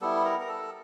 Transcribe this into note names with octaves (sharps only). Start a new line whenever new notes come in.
G3 B3 E4 A4
A#4
A#4
A4